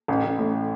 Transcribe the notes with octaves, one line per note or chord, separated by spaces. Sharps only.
A1
A1
A2